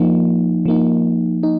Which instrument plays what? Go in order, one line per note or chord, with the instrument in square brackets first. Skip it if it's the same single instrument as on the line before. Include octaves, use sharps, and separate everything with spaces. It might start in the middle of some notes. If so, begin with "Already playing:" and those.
Already playing: [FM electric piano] F3 A#3 D#4
F3 A#3 D#4
D#4